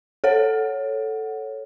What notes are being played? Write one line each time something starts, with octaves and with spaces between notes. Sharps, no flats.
A4 C#5 F#5